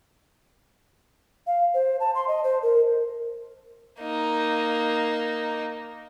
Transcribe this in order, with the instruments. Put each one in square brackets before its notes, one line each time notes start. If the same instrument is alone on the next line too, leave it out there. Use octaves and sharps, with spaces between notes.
[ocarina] F5
C5
A5
C6
D#5
C5
A#4
[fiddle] A#3 D#4